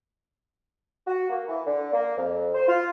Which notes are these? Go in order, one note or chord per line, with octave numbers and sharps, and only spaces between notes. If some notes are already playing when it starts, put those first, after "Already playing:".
F#4
A#3
E3
D3
A#3
F2
C5
F4